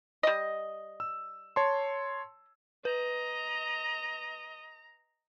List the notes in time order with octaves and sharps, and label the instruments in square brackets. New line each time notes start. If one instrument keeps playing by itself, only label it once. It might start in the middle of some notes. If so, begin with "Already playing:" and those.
[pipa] G3 D#5
[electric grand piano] E6
C#5 A5 C6
[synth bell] B4 [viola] D#5 [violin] A#5